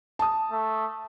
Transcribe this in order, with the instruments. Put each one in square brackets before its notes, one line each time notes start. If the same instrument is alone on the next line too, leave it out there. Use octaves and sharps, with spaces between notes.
[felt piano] A5 D#6
[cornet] A3